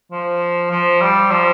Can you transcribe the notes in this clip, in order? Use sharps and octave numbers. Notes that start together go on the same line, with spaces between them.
F3
F3
G3
F3